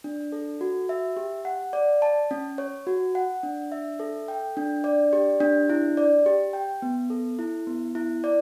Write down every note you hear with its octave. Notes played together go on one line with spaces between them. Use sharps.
D4
A4
F#4
E5
G4
F#5
D5
A5
C#4
C#5
F#4
F#5
D4
E5
A4
G5
D4
D5
G4
D4
E4
D5
G4
G5
B3
A4
E4
B3
E4
D5